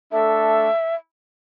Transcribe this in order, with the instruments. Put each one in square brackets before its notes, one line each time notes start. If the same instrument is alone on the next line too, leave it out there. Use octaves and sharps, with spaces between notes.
[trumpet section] A3 D4 A4 [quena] E5